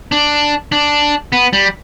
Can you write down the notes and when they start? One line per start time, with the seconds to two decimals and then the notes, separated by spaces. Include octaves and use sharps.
0.12 D4
0.72 D4
1.32 B3
1.53 G3